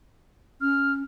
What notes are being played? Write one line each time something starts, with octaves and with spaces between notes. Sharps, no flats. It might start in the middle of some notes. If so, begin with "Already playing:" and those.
C#4 F6